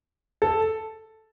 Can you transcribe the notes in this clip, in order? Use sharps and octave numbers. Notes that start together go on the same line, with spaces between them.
A4